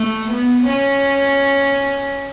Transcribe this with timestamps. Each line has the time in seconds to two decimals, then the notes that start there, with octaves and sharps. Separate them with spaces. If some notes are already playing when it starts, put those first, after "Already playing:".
Already playing: A3
0.31 B3
0.68 C#4